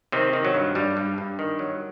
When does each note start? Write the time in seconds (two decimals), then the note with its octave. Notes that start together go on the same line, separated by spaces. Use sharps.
0.12 C3 D#3 C4
0.33 D#3
0.45 F#3
0.54 G2
0.75 G2 G3
0.97 G2
1.18 G2
1.39 D#3
1.59 F#3